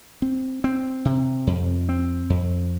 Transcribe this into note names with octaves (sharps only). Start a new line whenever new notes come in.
C4
C4
C3
F2
C4
F2